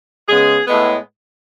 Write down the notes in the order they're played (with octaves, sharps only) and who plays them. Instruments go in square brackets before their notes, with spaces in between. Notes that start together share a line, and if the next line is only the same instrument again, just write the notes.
[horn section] C#3 G#3 B3 G#4
A2 G#3 B3